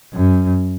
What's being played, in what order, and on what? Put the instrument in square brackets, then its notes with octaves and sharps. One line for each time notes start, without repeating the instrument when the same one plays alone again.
[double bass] F#2